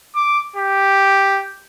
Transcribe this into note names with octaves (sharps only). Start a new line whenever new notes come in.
D6
G4